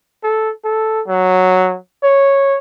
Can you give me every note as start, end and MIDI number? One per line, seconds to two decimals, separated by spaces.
0.23 0.50 69
0.64 1.01 69
1.08 1.77 54
2.03 2.58 73